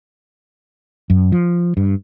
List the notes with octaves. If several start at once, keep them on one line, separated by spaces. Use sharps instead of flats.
F#2
F3
G2